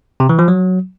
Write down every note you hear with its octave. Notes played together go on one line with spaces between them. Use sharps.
C3
E3
F3
F#3